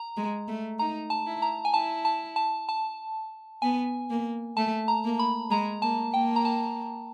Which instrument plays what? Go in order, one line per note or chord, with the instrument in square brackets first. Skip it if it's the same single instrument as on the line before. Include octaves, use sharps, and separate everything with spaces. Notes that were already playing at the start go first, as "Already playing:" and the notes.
Already playing: [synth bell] A#5
[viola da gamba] G#3
A3
[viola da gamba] D#4 [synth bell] A#5
[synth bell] A5
[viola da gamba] E4
[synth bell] A#5
G#5
[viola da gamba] E4 [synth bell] A5
[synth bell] A5
A5
A5
[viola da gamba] B3 [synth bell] G#5
[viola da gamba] A#3
[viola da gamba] A3 [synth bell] A5
[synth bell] A#5
[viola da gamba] A#3
[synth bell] B5
[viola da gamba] G#3 [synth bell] A#5
[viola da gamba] A#3 [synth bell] A5
[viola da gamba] A#3 [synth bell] G5
[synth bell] A#5
A5